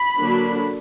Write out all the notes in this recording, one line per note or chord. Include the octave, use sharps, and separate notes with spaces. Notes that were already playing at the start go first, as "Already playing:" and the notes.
Already playing: B5
D3 F#3 A#3 D4